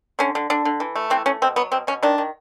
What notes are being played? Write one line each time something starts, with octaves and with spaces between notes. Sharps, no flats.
D3 C#4
D3
D3 D4
D3
E3
A3
E3 C4
A3 C#4
B2 C4
F#3 B3
B2 C4
B2 C#4
D#3 D4
D#3